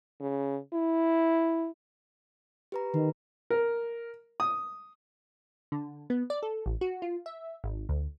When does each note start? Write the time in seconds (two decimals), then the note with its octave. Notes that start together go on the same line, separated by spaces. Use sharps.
0.21 C#3
0.73 E4
2.72 G4 B4 A#5
2.94 D#3 G4 B4
3.50 A#4
4.40 D#6
5.72 D3
6.10 B3
6.30 D5
6.43 A4
6.66 A1
6.81 F#4
7.02 F4
7.26 E5
7.64 G#1
7.89 D2